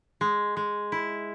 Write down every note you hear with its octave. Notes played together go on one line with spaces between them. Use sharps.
G#3
G#3
E4